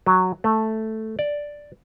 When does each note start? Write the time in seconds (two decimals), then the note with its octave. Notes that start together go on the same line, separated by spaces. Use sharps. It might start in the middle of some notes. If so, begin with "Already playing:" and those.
0.06 F#3
0.44 A3
1.19 D5